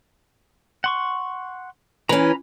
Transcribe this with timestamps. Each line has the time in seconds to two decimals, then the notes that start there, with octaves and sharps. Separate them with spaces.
0.84 F#5 C6 C#6
2.09 E3 C#4 A#5 B5